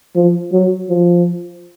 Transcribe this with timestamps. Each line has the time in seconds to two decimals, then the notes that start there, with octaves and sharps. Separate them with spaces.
0.16 F3
0.52 F#3
0.89 F3